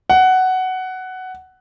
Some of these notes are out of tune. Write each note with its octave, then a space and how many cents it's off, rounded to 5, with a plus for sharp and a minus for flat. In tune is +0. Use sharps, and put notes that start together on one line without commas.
F#5 +10